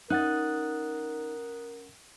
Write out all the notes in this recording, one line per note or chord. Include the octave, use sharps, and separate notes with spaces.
C#4 D#4 A#4 F#5 D#6 F#6 A6